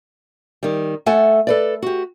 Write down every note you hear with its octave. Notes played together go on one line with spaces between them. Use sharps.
D#3 G3
A3 A4 E5 F#5 G#5
A4 B4 D5
F#4 G4